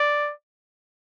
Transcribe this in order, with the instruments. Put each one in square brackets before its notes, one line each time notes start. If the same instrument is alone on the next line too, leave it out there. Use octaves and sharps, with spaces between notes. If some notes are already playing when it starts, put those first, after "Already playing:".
Already playing: [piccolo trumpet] D5